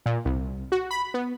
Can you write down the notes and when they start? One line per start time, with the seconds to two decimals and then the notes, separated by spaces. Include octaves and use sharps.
0.06 A#2
0.25 C2
0.72 F#4
0.91 B5
1.14 B3